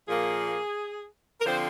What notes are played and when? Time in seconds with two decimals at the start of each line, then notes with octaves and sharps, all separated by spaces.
0.08 A#2 F3 A#3 G#4
1.41 A#4
1.45 D3 F3 C4 C5